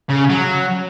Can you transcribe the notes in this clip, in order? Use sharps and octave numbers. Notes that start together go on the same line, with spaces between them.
C#3
F#3